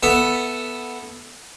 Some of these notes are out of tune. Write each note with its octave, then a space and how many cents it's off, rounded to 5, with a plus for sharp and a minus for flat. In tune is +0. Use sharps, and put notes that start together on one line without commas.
B3 -5 A4 +0 E5 +0